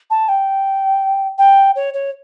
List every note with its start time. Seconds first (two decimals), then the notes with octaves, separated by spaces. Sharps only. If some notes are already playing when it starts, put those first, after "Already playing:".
0.10 A5
0.29 G5
1.38 G5
1.76 C#5
1.94 C#5